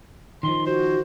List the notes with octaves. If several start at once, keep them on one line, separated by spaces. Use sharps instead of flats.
D#3 F3 C6
F#4 C5